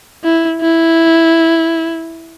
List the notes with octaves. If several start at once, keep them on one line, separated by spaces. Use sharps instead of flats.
E4
E4